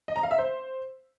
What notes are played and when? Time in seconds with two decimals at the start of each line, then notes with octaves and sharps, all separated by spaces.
0.08 D#5
0.16 A#5
0.23 F5
0.31 E5
0.38 C5